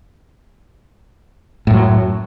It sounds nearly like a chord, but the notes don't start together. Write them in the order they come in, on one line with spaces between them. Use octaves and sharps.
A2 F#2 F#3